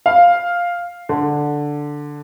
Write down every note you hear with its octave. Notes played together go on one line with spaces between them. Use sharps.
F5
D3